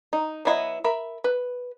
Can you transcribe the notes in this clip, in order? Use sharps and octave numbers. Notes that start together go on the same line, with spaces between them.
D#4
F#3 B3 E4 F4 D#5
A#4 E5 B5
B4